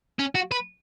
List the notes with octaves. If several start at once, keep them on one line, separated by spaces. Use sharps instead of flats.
C#4
F#4
B4